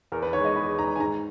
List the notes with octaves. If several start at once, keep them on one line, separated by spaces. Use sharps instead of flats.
E2 A#4
B4
D#3 G#3 C#5
D#5
E2 B5
D#3 G#3 A#5
G#5
G#2 A#5